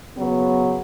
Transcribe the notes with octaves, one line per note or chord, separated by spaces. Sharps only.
C#3 F#3 B3